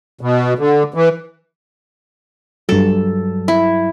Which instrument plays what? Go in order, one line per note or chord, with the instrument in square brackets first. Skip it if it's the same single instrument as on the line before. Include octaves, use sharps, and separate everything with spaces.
[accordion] B2
D3
E3
[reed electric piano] G2 F#3 [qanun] A4
[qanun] E4